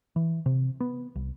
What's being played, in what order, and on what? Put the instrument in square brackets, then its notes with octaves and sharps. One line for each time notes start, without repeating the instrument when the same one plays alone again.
[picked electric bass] E3
C3
B3
C2